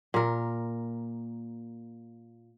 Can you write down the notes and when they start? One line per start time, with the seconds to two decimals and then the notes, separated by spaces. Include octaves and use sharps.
0.14 A#2 A#4